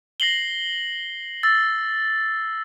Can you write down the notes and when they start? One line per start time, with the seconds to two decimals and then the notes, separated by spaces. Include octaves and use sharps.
0.20 A#6 C7 F#7 G7
1.43 E6 A6